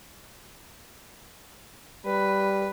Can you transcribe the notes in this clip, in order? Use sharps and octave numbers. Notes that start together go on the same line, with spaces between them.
G3 B4